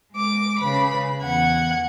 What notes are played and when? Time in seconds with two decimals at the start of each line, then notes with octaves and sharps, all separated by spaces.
0.10 G#3 D6
0.58 C#3 B4 B5
1.22 E2 F#5 G#6